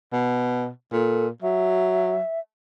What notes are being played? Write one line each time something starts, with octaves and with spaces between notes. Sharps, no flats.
B2
A#2 A4
F#3 E5